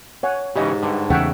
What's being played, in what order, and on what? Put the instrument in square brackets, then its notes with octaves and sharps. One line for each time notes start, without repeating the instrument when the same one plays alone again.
[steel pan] C#5 F#5 G#5
[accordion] G#2 [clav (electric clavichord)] C#3 E3 C#4 [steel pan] G4 D#5
[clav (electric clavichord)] G2 D3
[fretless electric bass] E2 C#3 [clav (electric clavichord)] A3 C#5 E5 [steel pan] F#5 G5